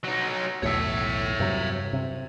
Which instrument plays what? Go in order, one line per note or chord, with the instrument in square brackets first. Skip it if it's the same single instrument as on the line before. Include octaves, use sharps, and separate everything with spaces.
[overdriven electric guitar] F#3 D#4
[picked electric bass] B1 E2 A2 [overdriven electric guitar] C#5 E5
[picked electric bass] G2 C3 F#3
C3